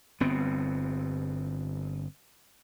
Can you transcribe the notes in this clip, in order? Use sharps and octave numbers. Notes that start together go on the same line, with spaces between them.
G1 B3 C4